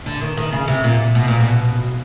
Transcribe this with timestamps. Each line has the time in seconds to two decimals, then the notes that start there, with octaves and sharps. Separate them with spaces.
0.06 D3
0.22 D#3
0.37 D#3
0.53 C#3
0.68 C3
0.84 A#2
1.15 B2
1.28 A#2
1.40 B2